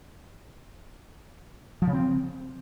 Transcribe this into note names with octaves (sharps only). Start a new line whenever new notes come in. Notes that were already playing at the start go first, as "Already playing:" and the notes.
F3
C#3
C4